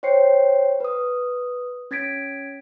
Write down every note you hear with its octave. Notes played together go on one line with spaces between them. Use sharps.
C5 C#5 G5 C7 C#7
B4 D#6
C#4 G#6 A6 B6 D7